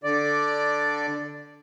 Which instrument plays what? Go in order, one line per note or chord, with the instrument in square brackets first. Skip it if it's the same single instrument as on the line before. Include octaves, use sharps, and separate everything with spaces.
[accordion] D3 D5